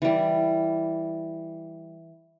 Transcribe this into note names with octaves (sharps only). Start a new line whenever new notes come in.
E3 G3